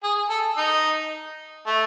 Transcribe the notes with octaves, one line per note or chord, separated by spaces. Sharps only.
G#4
A4
D#4
A3